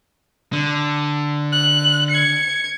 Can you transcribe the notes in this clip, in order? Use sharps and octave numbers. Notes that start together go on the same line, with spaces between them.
D3
F#6
G#6 C#7